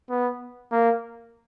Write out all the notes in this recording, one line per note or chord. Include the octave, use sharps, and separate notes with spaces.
B3
A#3